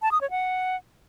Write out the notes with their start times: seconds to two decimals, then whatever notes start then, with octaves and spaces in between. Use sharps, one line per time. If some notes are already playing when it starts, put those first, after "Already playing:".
0.02 A5
0.12 D#6
0.21 C#5
0.31 F#5